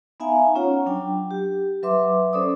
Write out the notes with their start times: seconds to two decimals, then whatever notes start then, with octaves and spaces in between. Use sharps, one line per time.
0.20 B3 D#4 E5 F5 G#5 A#5
0.55 C#4 F4 C#5 F#5 A#5
0.86 F#3 D4 G5
1.31 G4
1.83 F#3 B4 E5 C6 D6
2.33 C#4 A4 C5 D5 D6 D#6